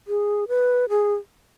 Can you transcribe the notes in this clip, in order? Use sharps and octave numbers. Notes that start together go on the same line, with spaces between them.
G#4
B4
G#4